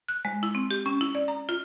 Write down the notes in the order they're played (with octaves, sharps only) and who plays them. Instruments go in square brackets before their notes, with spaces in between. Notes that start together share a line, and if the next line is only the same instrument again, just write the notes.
[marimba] F#6
G#3
E4
C4
G4
C#4
E4
D5
A#5
F4